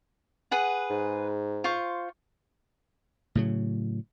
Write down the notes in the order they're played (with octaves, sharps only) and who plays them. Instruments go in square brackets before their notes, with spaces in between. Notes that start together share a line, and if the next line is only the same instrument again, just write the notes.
[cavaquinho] G#4 B4 F#5
[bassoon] G#2
[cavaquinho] F4 C5 C#6
[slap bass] A2 C#3 F#3